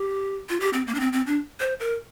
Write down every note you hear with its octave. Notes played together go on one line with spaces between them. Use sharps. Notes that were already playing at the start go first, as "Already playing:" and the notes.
Already playing: G4
F4
G4
C4
A#3
D4
C4
C4
D4
C5
A#4